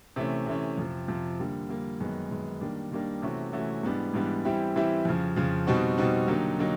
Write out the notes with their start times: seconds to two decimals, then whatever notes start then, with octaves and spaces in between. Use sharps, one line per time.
0.16 C3 E3 A3 C#4
0.46 C3 E3 A3 C#4
0.77 F2 C3 F3
1.08 F2 C3 F3
1.39 D3 G3 A#3
1.69 D3 G3 A#3
2.00 F#2 D#3 G#3 B3
2.31 F#2 D#3 G#3 B3
2.61 D#3 G3 A#3 D4
2.92 D#3 G3 A#3 D4
3.22 C3 E3 A3 C#4 F#4
3.52 C3 E3 A3 C#4 F#4
3.83 G#2 E3 G3 B3 D4
4.14 G#2 E3 G3 B3 D4
4.45 E3 G3 C4 E4 G4
4.76 E3 G3 C4 E4 G4
5.05 F2 C#3 F3
5.36 F2 C#3 F3
5.67 B2 G3 C4 D#4 F#4
5.98 B2 G3 C4 D#4 F#4
6.28 D3 F#3 A#3 D#4 G4
6.59 D3 F#3 A#3 D#4